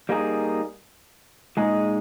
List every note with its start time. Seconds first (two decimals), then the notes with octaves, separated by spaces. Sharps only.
0.09 G3 A#3 D#4 G#4
1.57 A#2 G#3 D#4 G#4